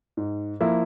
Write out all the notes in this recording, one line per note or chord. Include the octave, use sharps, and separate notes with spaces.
G#2
F3 A#3 E4